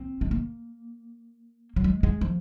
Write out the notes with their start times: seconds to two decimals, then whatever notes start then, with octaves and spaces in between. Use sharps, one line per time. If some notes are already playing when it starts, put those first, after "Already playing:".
Already playing: C4
0.21 G#3
0.31 A#3
1.76 F#3
1.84 G#3
2.03 G#3
2.21 F3